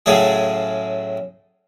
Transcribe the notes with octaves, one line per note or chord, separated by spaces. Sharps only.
A2 C#3 F#3 A3 G#4